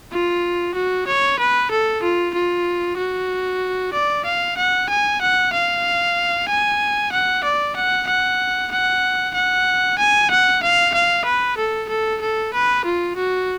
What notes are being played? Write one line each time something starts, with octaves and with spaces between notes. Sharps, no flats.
F4
F#4
C#5
B4
A4
F4
F4
F#4
D5
F5
F#5
G#5
F#5
F5
G#5
F#5
D5
F#5
F#5
F#5
F#5
G#5
F#5
F5
F5
B4
A4
A4
A4
B4
F4
F#4